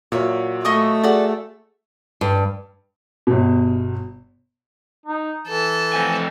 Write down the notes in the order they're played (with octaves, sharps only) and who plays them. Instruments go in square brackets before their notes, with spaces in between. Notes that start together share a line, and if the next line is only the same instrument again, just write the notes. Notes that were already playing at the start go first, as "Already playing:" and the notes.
[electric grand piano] A#2 [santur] F#3 A#4 [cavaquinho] C#5 E5
[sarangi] A3 [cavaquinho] D#5 C#6 D#6
[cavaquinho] F#4 D5 [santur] G#4 A4
[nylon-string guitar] G2
[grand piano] G1 B2
[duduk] D#4
[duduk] E3 [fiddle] A4
[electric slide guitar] F2 C4 G#5